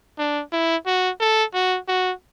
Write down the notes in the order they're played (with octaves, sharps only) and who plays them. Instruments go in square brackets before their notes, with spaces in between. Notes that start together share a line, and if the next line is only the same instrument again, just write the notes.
[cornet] D4
E4
F#4
A4
F#4
F#4